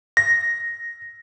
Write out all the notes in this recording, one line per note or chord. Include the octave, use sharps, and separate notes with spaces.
A#6